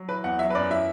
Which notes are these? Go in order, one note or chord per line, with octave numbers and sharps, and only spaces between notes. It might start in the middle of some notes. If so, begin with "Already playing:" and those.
Already playing: F#3
E3 B4
E2 F#5
F#3 E5
B4
F#2 D5
E3 E5